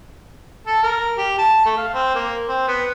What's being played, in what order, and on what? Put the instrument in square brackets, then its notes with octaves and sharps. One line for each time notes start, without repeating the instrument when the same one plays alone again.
[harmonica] A4
A#4
G4
A5
A3
F5
C4
A#3
C4
B3